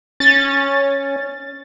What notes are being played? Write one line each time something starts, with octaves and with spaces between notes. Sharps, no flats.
C#4 A6